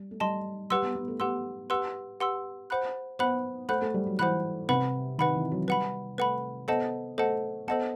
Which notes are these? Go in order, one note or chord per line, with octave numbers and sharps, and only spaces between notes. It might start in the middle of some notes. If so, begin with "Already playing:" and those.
Already playing: G3
A3
G3 D#5 A5 C6
G3 G4 B4 F#5 C6 E6
B3
B3
A3
B3 G4 B4 F#5 C6 E6
G4 B4 F#5 C6 E6
G4 B4 F#5 C6 E6
C5 F#5 B5 F#6
B3 C5 F#5 B5 F#6
A3 C5 F#5 B5 F#6
A3
G3
F#3
E3 C5 F#5 B5 F#6
C3 B4 F#5 B5
D#3 B4 F#5 B5
E3
F#3
G3 B4 F#5 B5
A3 B4 F#5 B5
B3 A4 C5 D#5 F#5 A5
A3 A4 C5 D#5 F#5 A5
B3 A4 C5 D#5 F#5 A5